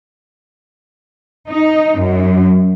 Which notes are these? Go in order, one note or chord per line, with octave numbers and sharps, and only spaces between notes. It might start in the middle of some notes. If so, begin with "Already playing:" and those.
D#4
F#2